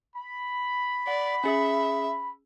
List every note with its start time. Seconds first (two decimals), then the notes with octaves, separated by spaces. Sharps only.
0.16 B5
1.07 D5 F#5
1.44 C#4 G#4 E5